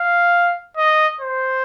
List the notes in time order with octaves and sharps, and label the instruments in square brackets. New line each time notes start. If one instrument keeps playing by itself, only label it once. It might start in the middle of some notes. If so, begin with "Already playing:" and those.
Already playing: [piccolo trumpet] F5
D#5
C5